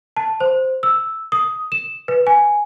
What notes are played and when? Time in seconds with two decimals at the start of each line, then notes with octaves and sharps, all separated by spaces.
0.17 A5
0.40 C5
0.83 E6
1.32 D#6
1.72 E7
2.08 B4
2.27 G#5